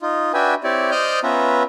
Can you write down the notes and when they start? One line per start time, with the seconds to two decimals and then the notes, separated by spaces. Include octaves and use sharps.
0.01 D#4 F4
0.34 D4 F#4 B4 E5 G5 G#5
0.64 C4 E4 G4 C#5 D5
0.92 C5 D5 D#5 D#6 F6 G6
1.23 B3 C#4 F4 B4 E5 A#5